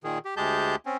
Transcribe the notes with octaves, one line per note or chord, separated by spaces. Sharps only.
A#2 D#3 G#4
G4
D2 G#3 G4 G#4 A5 G6
C4 C#4